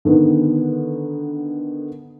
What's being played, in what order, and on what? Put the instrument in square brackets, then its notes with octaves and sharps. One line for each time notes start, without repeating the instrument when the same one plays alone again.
[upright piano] D3 D#3 B3